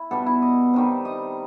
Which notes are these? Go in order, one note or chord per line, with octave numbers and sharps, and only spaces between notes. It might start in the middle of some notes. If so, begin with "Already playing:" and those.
Already playing: E4
B2 G3 B3 A4
E4
D#5
C3 D#3 G3
D#5